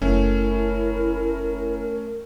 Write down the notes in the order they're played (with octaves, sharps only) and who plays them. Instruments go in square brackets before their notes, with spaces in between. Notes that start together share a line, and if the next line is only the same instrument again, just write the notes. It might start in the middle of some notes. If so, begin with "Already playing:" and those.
[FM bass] F#1 [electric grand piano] A3 C#4 [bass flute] E4 [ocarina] A#4